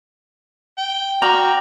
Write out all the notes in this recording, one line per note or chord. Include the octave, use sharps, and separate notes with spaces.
G5
F#4 D5 F5 G5 A#5